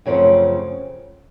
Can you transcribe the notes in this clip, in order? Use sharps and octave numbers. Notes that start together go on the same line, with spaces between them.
F#2 C#3 F3 A3 C4